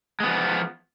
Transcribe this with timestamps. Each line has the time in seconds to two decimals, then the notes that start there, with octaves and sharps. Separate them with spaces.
0.20 G#3
0.23 B3
0.26 F3